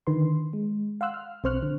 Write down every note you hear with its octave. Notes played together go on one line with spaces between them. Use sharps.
D3 D#3 B4 C6
G#3
F5 F#5 C6 E6 F#6
F6
B1 C4 C5 C#6 F6 F#6
D3